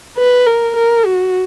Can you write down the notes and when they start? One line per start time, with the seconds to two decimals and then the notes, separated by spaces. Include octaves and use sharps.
0.18 B4
0.46 A#4
0.76 A#4
1.05 F#4